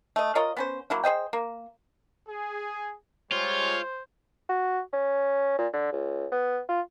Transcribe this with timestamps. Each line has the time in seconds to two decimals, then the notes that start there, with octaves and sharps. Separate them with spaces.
0.16 A3 D#5
0.35 F4 A#4 C#5 D#5
0.57 B3 C#4 C5
0.90 F#3 A#3 E4
1.04 G#4 C5 D#5 G5
1.33 A#3
2.28 G#4
3.32 G3 G#3 F4 C5 C#5
4.49 F#4
4.93 C#4
5.58 A#2
5.73 D3
5.92 C#2
6.32 B3
6.69 F4